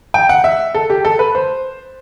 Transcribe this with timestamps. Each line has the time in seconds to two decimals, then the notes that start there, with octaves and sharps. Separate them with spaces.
0.14 G5
0.29 F#5
0.44 E5
0.75 A4
0.90 G4
1.05 A4
1.19 B4
1.35 C5